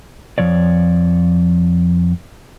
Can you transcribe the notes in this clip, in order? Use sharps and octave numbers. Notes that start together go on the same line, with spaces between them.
F2 D#3 F3 C#5 D5